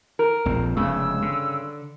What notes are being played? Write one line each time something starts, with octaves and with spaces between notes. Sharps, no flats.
A#4
A#1 F2 C4
F1 G2 C#3 G#3 B3 E6
D3